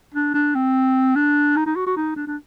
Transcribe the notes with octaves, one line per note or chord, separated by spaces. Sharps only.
D4
D4
C4
D4
D#4
D#4
F#4
F#4
D#4
D4
D4